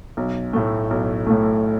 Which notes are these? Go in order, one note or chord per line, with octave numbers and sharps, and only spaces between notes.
B1
A2 A3
B1
A2 A3